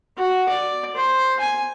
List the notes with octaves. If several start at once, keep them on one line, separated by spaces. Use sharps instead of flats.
F#4
D5
C5
G#5